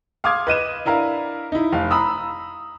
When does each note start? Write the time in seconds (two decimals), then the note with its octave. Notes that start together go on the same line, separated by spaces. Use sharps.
0.24 F5 C6 D6 D#6 F6 G#6
0.47 B4 D#5 D#7 E7
0.85 D4 E4 A#4 F5 A#5
1.52 D#4 E4
1.72 F1 F5
1.91 A#5 B5 D#6 E6